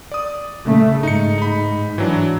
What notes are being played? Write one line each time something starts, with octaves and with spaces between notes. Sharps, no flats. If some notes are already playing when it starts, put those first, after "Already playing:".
D5 D#6
C#3 A3
G#2 D#4 C#7
D#4 B5
E3 F#3 D4